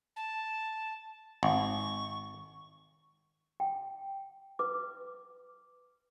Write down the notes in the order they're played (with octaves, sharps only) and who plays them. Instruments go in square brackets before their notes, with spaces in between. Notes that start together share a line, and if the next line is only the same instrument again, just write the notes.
[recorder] A5
[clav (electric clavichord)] G#1 [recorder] C#6
[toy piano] G5
B4 D6